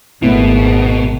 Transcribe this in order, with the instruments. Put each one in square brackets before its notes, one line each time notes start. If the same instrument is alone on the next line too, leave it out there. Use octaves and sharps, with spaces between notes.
[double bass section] G#1 [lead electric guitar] B2 [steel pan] A3 B3 E4